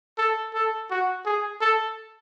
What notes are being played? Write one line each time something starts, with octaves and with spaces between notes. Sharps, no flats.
A4
A4
F#4
G#4
A4